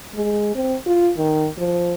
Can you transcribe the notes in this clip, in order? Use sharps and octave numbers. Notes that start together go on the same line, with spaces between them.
G#3
C4
F4
D#3
F3